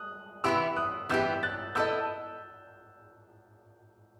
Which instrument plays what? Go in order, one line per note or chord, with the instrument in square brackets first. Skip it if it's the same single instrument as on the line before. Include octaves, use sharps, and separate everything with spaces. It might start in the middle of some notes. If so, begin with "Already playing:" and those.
Already playing: [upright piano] D#6 F#6
[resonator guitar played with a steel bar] E3 B3 E4 G4 [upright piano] C6 E6
[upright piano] D#6 F#6
[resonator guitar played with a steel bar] E3 B3 E4 G4 [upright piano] E6 G6
[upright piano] F#6 A6
[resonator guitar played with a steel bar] B3 E4 A4 D#5 [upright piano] E6 G6